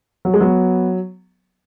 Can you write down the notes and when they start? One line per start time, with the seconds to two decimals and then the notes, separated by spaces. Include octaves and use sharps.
0.25 F#3
0.34 G#3
0.40 F#3 B3